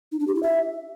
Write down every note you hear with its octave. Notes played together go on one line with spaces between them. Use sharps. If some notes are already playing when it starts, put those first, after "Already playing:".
D#4
D4
G4
E4
E5